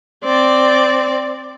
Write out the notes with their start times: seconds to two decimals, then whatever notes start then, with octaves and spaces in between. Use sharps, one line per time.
0.24 C4 D5